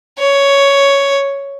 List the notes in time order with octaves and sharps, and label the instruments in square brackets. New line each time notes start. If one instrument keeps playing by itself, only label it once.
[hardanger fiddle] C#5